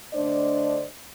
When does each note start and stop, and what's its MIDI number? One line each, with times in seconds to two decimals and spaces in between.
0.14 0.85 50
0.14 0.85 57
0.14 0.85 62
0.14 0.85 72
0.14 0.85 74
0.14 0.85 75